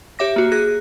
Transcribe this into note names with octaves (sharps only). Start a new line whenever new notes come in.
G4 C#5 E5 D6 A#6
A#3 F#4
G#4 F#6 A#6